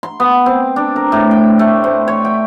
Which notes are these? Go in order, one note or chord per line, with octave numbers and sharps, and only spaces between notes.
C6
B3
C4
D4
A#4
A2
G5
A3
C5
C#5
G5